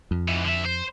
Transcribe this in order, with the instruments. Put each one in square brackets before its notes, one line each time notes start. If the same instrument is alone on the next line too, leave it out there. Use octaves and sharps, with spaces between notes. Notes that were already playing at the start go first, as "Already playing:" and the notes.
[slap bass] F2
[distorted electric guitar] G#2 E3
D3 E5
C5